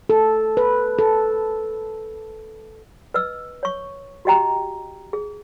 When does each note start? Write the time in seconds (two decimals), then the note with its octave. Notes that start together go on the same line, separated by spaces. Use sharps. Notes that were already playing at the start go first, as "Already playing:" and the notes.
0.10 A4
0.57 B4
0.99 A4
3.14 B4 D#5 E6
3.63 C#5 C#6
4.25 F#4 G4 D#5 G5 A#5
5.13 G#4